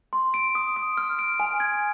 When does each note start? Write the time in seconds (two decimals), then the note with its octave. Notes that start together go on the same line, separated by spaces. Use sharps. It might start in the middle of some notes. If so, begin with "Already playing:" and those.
0.13 C6
0.34 D7
0.55 D#6
0.76 D#6
0.97 F6
1.19 D7
1.40 G#5
1.60 G#6